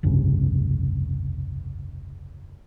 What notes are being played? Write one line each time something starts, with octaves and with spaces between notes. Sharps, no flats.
F1 C2 G2 C#3